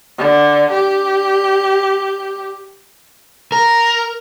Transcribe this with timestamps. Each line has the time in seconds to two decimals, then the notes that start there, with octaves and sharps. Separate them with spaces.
0.19 D3
0.71 G4
3.52 A#4